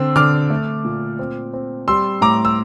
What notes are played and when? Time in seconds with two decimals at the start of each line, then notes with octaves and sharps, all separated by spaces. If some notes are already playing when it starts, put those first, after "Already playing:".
Already playing: D3 C4 E6
0.16 D3 D6 F6
0.50 A3
0.85 A#2
1.19 C4
1.53 C4
1.88 G3 C6 E6
2.21 A2 A#5 D6
2.45 E6